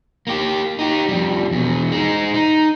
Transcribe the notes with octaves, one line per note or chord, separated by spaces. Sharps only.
A#3 G4
D#4 G4
F2 G3
E2 B2
G#3 D#4
D#4